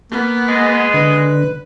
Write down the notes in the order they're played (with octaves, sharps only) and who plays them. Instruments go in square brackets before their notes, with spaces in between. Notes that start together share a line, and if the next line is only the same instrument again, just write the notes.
[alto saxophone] A#3 [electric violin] B3
[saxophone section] G#3
[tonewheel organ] D3 [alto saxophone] B4